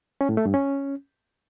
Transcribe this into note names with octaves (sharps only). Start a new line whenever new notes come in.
C#4
A2
A3
G2
C#4